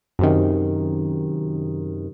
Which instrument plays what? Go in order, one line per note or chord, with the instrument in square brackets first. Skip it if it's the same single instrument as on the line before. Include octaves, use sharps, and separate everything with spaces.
[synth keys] F#2 C3 D#3